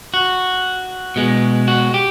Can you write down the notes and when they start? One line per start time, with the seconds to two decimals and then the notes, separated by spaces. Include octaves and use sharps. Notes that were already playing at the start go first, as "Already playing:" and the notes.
0.14 F#4
1.16 B2 G#3
1.68 F#4
1.94 G4